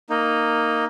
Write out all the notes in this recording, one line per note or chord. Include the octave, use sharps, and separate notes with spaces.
A#3 D#4